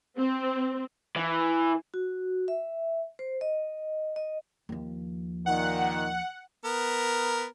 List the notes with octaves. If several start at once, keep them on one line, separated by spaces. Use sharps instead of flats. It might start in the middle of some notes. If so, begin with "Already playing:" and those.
C4
E3
F#4
E5
C5
D#5
D#5
D#2 F3
A#2 D#3 F#5
B3 A#4